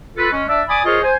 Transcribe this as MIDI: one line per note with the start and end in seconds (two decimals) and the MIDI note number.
0.16 0.30 65
0.16 0.30 69
0.16 0.30 71
0.31 0.43 56
0.31 0.43 61
0.47 0.61 62
0.47 0.61 74
0.47 0.61 76
0.68 0.79 74
0.68 0.79 80
0.68 0.79 83
0.68 0.79 86
0.68 0.79 87
0.85 0.98 65
0.85 0.98 68
0.85 0.98 70
0.85 0.98 72
0.85 0.98 73
0.85 0.98 75
1.02 1.14 72
1.02 1.14 80